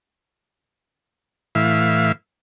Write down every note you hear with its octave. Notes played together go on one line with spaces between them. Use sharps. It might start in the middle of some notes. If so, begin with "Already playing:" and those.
A2 E3 E5 F5